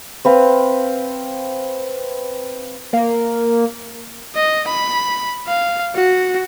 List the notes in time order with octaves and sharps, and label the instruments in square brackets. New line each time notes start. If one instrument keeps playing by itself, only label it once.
[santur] C4 B4 F5
[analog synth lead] A#3
[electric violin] D#5
B5
F5
F#4